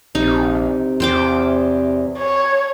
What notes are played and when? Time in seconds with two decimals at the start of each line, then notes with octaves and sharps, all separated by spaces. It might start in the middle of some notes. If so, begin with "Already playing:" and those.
0.15 A#1 C3 D#4
1.00 E2 C5 G5 D6
2.19 C#5